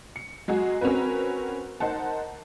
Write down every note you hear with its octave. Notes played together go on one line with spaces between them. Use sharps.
C#7
F#3 G#3 F#4 G#4
C4 C#4 F#4 A#4 B4
D#4 A#4 C5 F#5 A5